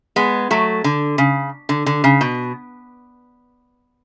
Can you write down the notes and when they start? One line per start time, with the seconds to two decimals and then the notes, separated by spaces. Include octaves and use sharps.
0.16 G#3 B3
0.51 F#3 A3
0.84 D3
1.18 C#3
1.69 D3
1.86 D3
2.04 C#3
2.21 B2